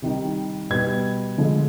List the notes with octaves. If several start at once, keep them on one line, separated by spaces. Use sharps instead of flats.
C3 D#3 G3
B2 G3 B3 G#6
D3 F3 G#3